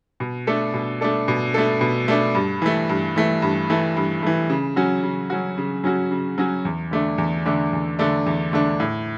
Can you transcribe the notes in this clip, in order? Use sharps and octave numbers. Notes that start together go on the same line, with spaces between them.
B2
A3 D4 A4
B2
A3 D4 A4
B2
A3 D4 A4
B2
A3 D4 A4
G2
E3 A3
G2
E3 A3
G2
E3 A3
G2
E3 A3
C#3
F#3 C#4 F#4
C#3
F#3 C#4 F#4
C#3
F#3 C#4 F#4
C#3
F#3 C#4 F#4
E2
D3 A3 D4
E2
D3 A3 D4
E2
D3 A3 D4
E2
D3 A3 D4
A2